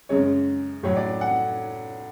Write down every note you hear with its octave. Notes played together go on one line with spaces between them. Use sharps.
F#2 C#3 G#3 C#5
A2 F#3 C#5
D5
F#5